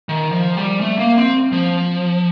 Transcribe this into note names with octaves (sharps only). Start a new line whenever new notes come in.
D#3
F3
G3
A3
A#3
C4
F3